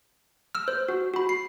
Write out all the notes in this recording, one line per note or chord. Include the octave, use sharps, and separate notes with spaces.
E6 F6
C5
F#4
F#4 B5
C7